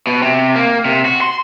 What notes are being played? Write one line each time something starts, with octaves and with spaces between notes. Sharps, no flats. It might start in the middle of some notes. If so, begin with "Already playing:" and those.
B2
C3
A#3
C3
F#4
C6